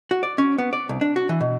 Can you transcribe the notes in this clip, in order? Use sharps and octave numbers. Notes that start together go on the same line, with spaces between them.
F#4
D5
C#4
B3
D5
C2
D4
F#4
E3
B2